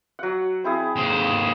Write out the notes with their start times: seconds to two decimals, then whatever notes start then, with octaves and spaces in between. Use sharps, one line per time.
0.19 F#3 F#5
0.64 C4 E4 G#4
0.96 D#2 C5